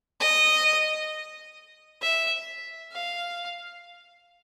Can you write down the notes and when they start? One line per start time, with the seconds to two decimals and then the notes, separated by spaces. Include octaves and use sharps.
0.20 D#5
2.01 E5
2.92 F5